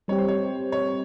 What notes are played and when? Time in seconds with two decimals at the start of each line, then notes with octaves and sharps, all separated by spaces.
0.08 G3 C4 G4 C#5
0.18 C5
0.28 C#5
0.72 C#5